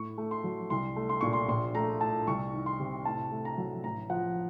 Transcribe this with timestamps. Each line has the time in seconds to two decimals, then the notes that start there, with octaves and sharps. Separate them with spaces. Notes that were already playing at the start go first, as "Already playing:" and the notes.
Already playing: A2 C#6
0.18 A3
0.31 C6
0.44 F#3
0.70 C2 C6
0.96 A3
1.09 C6
1.21 A#2 C#6
1.33 C6
1.48 A#1 C6
1.75 A3 A#5
2.01 A2 A5
2.27 C2 C#6
2.53 D#3
2.66 C6
2.79 C3
3.05 A2 A5
3.32 A3
3.45 A#5
3.58 F#3
3.84 A1 A#5
4.10 F3 F#5